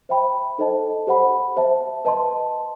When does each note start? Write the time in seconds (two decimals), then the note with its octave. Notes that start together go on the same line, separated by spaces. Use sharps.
0.09 C5 E5 G5 B5
0.58 D#4 A4 C5 D#5 A5
1.07 G4 C5 F#5 B5
1.57 C5 E5 A5
2.05 B4 D#5 A5 C6